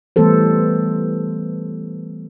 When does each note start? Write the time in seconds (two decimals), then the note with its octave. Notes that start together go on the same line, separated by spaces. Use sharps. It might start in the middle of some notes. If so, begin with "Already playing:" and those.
0.16 E3 G3 A3 B3 A4 C5